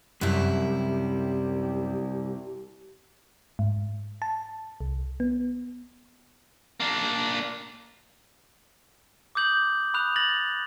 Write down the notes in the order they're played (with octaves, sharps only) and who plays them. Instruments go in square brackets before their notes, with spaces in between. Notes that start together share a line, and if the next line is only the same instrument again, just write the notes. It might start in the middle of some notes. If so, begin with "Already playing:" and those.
[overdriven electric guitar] C2 [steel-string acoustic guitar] F#2 E4 [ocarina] G4
[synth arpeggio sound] G#2
A5
C2
B3
[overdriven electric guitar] A#3 D4
[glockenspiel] D6 D#6 G6 F#7
B5 D#6 F#6 F7
A6 A#6 F#7